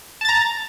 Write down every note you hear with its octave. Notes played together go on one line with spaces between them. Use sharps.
A5 A#5 A6